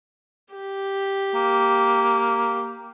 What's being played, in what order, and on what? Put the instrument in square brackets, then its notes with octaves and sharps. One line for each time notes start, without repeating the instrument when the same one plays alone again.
[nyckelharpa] G4
[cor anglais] A#3